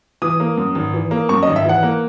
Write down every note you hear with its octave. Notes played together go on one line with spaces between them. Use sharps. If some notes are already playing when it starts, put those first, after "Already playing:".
E3 D#6
A#3
F#2
G#1
E3
A#3
F#2 C#6
D#5
G#1
E5
E3 F#5
A#3